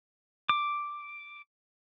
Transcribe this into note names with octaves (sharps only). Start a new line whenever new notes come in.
D6